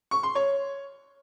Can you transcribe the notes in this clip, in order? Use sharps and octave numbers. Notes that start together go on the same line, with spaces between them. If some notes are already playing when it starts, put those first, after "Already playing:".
C#6
C6
C#5